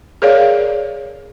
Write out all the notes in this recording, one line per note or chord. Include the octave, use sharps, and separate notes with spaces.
G#4 A#4 C#5 D5 F5